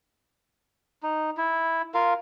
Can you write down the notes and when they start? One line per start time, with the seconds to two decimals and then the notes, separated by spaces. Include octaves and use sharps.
1.03 D#4
1.37 E4
1.94 F4 A#4 F5